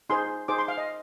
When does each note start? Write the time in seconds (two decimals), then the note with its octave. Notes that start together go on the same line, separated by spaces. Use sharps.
0.09 D#4 G#4 C5 C6
0.48 D#4 G#4 C5 D6
0.58 C6
0.68 F5
0.78 D#5